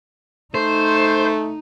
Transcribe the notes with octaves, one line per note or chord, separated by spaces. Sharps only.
A3 D#4 C5